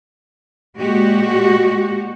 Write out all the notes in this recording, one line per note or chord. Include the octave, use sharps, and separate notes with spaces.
A#2 G#3 F#4 G4